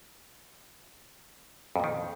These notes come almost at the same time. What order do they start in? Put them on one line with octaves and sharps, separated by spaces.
F2 A#2 D#3